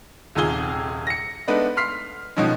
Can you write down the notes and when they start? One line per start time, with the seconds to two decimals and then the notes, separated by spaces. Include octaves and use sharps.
0.35 D#1 D#2 C3 F4 G#4 G7
1.07 A#6 C#7
1.48 G#3 A3 B3 D4 D#4 B4
1.77 C6 F6 B6 C7
2.37 B2 D#3 F3 G#3 C#4